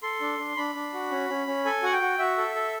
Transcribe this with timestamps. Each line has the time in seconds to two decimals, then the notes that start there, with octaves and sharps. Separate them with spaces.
0.03 A4 C6
0.21 D4
0.39 D4
0.56 D4 B5
0.75 D4
0.93 F#4
1.11 C#4
1.29 C#4
1.47 C#4
1.65 A4 G#5
1.83 F#4 F#5
1.93 G5
2.02 F#4
2.19 F#4 E5
2.37 A4
2.55 A4